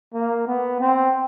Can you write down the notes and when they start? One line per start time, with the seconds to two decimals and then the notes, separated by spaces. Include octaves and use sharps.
0.14 A#3
0.47 B3
0.80 C4